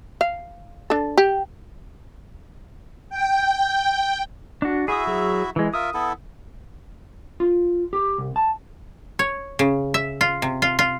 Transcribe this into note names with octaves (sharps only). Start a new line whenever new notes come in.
F5
D4 A4
G4
G5
D4 F#4
E4 F#4 G#4 E5 D#6
F#3 G#4
E3 G#3
F4 A#4 E5 D#6
B3 E4 A4
F4
G4
C2
A5
C#5
C#3
E5
F4
C3
F4
F4